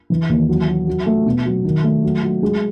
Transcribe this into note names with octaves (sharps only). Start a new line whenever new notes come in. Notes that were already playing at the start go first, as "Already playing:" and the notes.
E3
D#2
F#3
F#3
F#3
A3
B2
F#3
D#3
A3
F#3
F#3
G#3